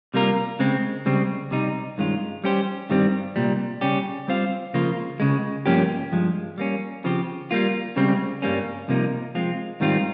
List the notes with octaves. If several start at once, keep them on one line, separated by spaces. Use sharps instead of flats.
C3 G3 A#3 F4 A#4
C#3 G#3 C4
C#2 C#3 G3 C4
C2 C3 G3 C4 D#4
G2 D#3 G#3 C#4 F4
G3 C#4 G4 C5
G2 D#3 G3 C4
C2 A#2 G3
C#3 G3 C#4 G4
G3 C4 F4 C5 F5
C#2 C#3 F3 A#3 F4
C#2 C#3 G#3
G2 F3 A#3 C#4 G4
G2 F3 G#3
G3 A#3 C#4
C#3 F3 C4 G4
G3 A#3 F4
C#2 C#3 G3 C4
G2 G3 A#3 C#4
C2 C3 F3 A#3 D#4
F3 G#3 C4 F4
G#2 D#3 G3 C4 F4